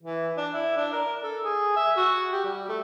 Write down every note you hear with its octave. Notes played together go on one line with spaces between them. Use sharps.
E3
D4
E4
D4
A#4
A4
G#4
E5
F#4
G4
G3
A3